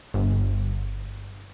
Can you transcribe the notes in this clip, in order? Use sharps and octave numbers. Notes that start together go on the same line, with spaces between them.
G1